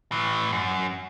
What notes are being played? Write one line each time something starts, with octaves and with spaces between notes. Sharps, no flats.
A2 E3
F#2